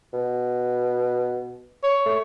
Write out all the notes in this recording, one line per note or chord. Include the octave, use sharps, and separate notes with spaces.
B2
C#5
A3